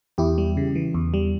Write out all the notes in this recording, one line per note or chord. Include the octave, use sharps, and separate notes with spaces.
E2 E4 G4
G3
C#3
E3
E2
G3